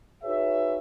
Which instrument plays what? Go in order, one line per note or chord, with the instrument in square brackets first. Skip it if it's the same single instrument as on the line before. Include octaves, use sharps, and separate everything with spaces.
[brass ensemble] D#4 F#4 G#4 B4 C#5 E5